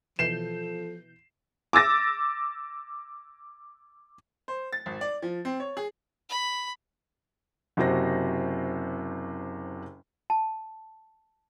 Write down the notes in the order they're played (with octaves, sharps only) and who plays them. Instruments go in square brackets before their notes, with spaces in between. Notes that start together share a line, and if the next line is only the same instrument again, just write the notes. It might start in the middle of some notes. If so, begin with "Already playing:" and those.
[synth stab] B2 E3 G6 [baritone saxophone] F3 [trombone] A4 [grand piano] C7 E7
[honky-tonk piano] D6 E6 A6 A#6
[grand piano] C5
A6
G#1
D5
F3
C4
C#5
G#4
[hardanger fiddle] B5
[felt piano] F#1 C3 F#4 C5 A#6
[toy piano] A5